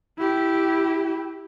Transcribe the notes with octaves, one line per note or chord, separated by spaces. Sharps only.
E4 G4